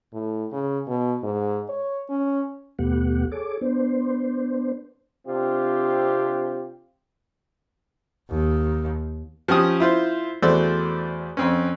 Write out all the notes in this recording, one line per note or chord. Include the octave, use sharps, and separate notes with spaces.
A2
C#3
B2
G#2
C#5
C#4
D#2 B2 A3 B3 G4 F#5
G#4 A4 C#5 D6
B3 D4 C5
C3 C4 D4 F4 G4
D#2
F3 C#4 G4 D#6
E4 F4 C5
E2 A3 F#4 C5 D5 E6
F2 C4 C#4